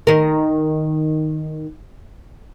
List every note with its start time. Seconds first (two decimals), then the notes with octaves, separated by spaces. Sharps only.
0.07 D#3 A#4